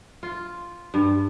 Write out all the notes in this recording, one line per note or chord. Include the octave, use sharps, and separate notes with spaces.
F4
G2